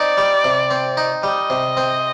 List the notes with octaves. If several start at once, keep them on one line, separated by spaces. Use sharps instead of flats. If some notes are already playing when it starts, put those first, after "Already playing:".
Already playing: C4 D#4 D5
G3
C3
C4
D#4
G3 D#5
C3
C4